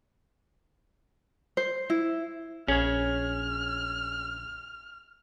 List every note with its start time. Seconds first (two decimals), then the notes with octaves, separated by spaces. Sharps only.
1.57 C5
1.90 E4
2.68 A#1 C#4 G#4 C#5 F6